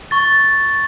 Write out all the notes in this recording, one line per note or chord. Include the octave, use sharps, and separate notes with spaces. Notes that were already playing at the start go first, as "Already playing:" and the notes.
C#6 A6